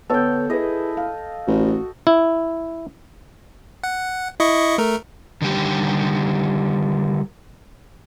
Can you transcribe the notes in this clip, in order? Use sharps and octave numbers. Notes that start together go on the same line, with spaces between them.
D3 B3 A4 C#5 G5
E4 G#4 B4 D#5
F5
A1 F#4
E4
F#5
E4 D#5 C#6
A3 A#4
D3 D#3 G3 G4